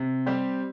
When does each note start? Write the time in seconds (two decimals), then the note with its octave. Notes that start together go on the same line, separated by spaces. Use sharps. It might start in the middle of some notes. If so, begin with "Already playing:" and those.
Already playing: C3
0.26 G3 C4 G4